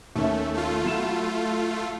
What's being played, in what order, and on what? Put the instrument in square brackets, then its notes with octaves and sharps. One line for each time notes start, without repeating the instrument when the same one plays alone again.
[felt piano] D#2 C#4 E5 [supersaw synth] A3
[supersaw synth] A3 F4
[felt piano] F#3 E4 E7